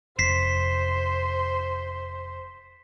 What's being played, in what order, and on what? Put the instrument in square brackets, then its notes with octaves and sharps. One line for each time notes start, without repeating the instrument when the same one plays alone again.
[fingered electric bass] F1 [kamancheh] C5 [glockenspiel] B6 C7 E7